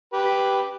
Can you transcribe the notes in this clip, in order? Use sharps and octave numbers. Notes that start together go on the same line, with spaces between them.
G4 B4